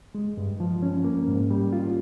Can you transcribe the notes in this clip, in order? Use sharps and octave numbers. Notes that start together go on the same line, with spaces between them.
G#3
G2
F3
C#4
A#3
G#2
G3
F4